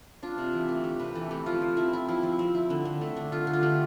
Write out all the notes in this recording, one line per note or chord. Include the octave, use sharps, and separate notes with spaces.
D4 F4
C3
E3
A3
D4 G4
C3 B4
E3 A4
A3 G4
F3 F4
F3
C4 E4
E4
F3 E4
F3
C4
E4
D3
D3
A3
D4
D3 F4
D3
F4
A3 G4